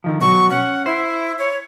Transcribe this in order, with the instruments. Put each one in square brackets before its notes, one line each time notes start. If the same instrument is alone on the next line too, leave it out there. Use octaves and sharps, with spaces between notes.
[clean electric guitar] D3 D#3 F3
[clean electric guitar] B2 F#3 [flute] C#6
[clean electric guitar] C#4 [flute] F#5
[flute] E4 [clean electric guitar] C5
[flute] C#5